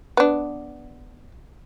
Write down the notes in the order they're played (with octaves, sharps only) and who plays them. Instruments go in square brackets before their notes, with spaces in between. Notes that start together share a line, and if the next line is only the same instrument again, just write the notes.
[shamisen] B3 D4